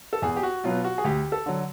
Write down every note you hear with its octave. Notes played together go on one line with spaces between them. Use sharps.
A4
E2 G#4
G4
F#4
B2 F#3 B3 F4
F#4
G#4
D2 G4
A4
D3 F#3